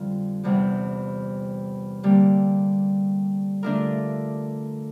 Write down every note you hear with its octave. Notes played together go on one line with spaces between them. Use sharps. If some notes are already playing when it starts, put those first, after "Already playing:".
Already playing: F2 D3 G3 F4
E2 C3 G3
D3 G3 A#3
D3 A3 D4 F4 A#4